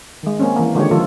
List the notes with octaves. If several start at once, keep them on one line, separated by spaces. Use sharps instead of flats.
D#3 G#3
A#3 C4 C#4
E3 A#3
D3 D#3 G#3 F4 G4 C#5
D3 D#3 F3 A3 F4 A4